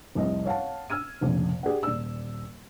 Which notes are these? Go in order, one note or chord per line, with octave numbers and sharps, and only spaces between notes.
F1 C2 D#5
C#5 F5 F#5 A5
E6 F6 G#6 D#7
F1 A#1 F2 C#3
G4 G#4 D5 F#5
D#1 D5 E6